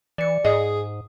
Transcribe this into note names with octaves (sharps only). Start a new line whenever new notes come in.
E3 D5 C#7
G#2 G#4 D#5 D#6